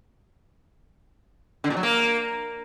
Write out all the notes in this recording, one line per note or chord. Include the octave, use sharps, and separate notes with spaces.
D3
A#2
F#3
A#3